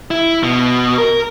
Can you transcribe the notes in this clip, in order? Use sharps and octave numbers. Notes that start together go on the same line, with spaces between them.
E4
B2
A#4